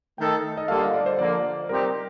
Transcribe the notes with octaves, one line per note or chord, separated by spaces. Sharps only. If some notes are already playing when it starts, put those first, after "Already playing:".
D#3 A3 D#4 A4 G5
D#5
D3 G3 A#3 F4 A4 F5
D#5
D5
C5
D3 F3 A#3 D5
C3 G3 C4 D#4 G4 A#4